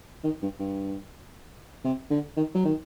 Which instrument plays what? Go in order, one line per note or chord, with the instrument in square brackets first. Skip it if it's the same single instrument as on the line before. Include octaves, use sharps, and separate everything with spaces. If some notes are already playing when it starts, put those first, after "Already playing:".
[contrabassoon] D#3
G2
G2
C3
D3
D#3
F#3
D#3